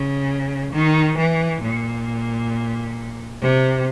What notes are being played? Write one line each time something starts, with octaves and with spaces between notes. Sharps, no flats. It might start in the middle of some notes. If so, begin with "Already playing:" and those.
Already playing: C#3
D#3
E3
A#2
C3